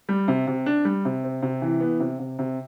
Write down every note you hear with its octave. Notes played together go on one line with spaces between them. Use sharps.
G3
C3
C3
D4
G3
C3
C4
C3
E3
B3
C3
C3
C3